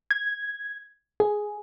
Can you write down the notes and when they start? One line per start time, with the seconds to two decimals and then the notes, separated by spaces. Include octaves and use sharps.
0.11 G#6
1.20 G#4